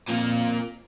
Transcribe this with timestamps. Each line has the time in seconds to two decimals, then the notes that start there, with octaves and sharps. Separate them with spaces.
0.09 F2 A#2 A#3